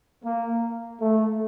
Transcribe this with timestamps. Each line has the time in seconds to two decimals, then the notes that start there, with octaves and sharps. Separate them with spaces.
0.24 A#3
1.01 A3